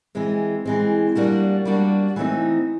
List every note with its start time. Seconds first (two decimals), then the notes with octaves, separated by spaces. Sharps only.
0.15 E3 G#3 C4
0.65 E3 G#3 C4
1.15 G3 A#3 D4 F#4
1.65 G3 A#3 D4 F#4
2.16 E3 A3 C4 D#4